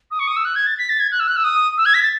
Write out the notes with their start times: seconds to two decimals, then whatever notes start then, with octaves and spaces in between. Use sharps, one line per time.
0.11 D#6
0.19 C#6
0.27 D#6
0.36 E6
0.44 F#6
0.55 G#6
0.66 A6
0.78 B6
0.89 A6
0.99 G#6
1.11 F#6
1.19 E6
1.27 F#6
1.36 E6
1.44 D#6
1.77 E6
1.85 G#6
1.94 B6
2.02 A6